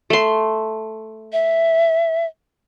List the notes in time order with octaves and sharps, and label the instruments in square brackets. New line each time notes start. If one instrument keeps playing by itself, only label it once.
[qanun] A3 C6
[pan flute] E5